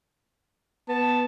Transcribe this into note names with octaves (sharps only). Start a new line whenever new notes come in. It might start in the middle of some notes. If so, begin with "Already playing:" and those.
B3 A5